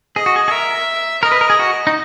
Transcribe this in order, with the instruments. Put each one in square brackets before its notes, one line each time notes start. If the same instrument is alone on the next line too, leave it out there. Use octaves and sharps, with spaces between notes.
[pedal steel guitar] G#4 [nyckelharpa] D#5
[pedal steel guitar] F#4
G#4
G#4
[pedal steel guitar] A#4 [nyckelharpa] E5
[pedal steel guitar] A#4 [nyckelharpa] D#5
[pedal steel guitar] B4
A#4
G#4
F#4
D#4